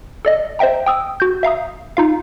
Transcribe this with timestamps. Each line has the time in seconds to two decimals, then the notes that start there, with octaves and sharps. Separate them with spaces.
0.25 A4 D5 D#5
0.59 C5 D#5 E5 G5 A#5
0.86 G5 D#6 E6
1.20 F#4 G6
1.43 E5 F5 A#5 D#6
1.97 D#4 F4 F5